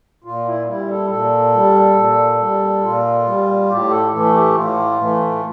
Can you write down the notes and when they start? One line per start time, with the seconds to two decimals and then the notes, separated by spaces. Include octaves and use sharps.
0.24 A#2 F4
0.46 E4
0.67 G3 E4
0.89 A4
1.10 A#2 A4
1.54 G3
1.97 A#2
2.40 G3
2.83 A#2 F4
3.26 G3
3.69 A2 G4
3.91 A4
4.12 E3 A3 A4
4.34 G4
4.55 A2 F4
4.99 E3 A3